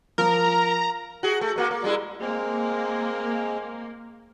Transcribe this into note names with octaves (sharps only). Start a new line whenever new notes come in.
F3 A#4 A#5
F#4 G#4
A3
G#3 A#3 F#4
A#3
G3 G#3 E4
G#3 A#3 C4